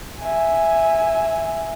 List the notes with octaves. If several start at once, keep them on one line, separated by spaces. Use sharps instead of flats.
E5 G#5